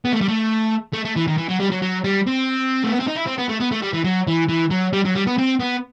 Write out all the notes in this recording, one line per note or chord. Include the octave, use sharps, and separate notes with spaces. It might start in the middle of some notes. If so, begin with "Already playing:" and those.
B3
A3
G3
A3
A3
A3
E3
D#3
E3
F#3
G3
F#3
F#3
G3
C4
A3
B3
C4
D#4
E4
C4
B3
A3
B3
A3
G3
E3
F#3
E3
E3
F#3
G3
F#3
G3
B3
C4
B3